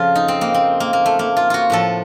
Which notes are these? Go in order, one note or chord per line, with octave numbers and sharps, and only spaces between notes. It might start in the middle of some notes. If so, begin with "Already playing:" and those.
Already playing: F2 C#3 F3 F4
D#4
C4
A#3
C4
A#3
A#3
A3
A#3
F4
F4 F#4
A2 F3 A4